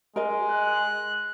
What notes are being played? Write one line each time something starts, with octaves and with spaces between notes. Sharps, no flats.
G#3 A#4 D#5
F#6